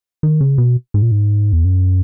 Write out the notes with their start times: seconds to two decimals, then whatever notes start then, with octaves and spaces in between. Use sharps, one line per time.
0.23 D#3
0.41 C#3
0.58 B2
0.94 G#2
1.02 A#2
1.11 G#2
1.53 E2
1.65 F#2